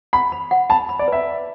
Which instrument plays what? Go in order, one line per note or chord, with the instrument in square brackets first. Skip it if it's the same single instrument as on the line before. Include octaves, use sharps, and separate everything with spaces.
[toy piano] F#5 [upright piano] B5
[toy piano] B5
F#5
[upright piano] A5 [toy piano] B5
[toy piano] B5
[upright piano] D5
[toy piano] B4 [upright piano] E5
[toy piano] B4